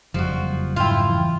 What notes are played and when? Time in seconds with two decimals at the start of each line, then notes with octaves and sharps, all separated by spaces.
0.14 F#1 F2 F3 G3 F#4
0.76 G#2 E4 F4 G5
1.10 E3